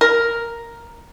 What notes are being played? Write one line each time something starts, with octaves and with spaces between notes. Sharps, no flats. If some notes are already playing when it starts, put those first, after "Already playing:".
A#4